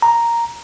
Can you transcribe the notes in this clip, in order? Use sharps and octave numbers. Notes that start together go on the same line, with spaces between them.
A#5